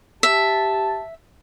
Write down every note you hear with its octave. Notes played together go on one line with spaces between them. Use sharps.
G4 E5 A5